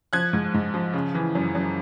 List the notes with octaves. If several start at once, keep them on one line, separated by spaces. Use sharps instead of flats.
F3 F#6 G#6
G#2
G#2
F3
C#3
E3
F#2
F#2